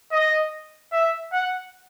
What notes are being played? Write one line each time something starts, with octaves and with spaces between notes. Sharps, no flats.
D#5
E5
F#5